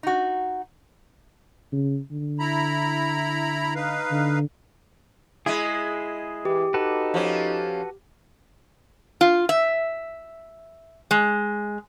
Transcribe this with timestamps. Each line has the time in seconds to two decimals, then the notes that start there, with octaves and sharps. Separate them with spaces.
0.03 D#4 F#4
1.72 C#3
2.11 D3
2.39 E4 A#5 B5
3.76 D#4 B4 F5
4.11 D3
5.46 G#3 E4 G#4 D#5
6.45 E3 G4
6.74 D#4 F#4 A4 B4
7.14 F3 C#4
9.21 F4
9.49 E5
11.11 G#3